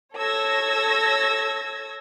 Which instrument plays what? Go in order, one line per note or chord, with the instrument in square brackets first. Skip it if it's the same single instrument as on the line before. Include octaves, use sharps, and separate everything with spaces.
[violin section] A4 C#5 E6 G#6 A#6